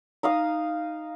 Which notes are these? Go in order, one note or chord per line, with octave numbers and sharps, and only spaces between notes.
D#4 F5 D#6